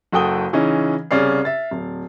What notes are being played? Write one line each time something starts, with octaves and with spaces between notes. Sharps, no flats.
F#1 F#4 A4 G5 D#6 G7
C#3 E3 C#4 D#4
C2 C#3 C#4 D5 F6 C7
E5 A6
D1